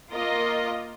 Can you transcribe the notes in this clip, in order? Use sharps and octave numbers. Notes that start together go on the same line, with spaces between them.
A#3 F4 A#4 D#5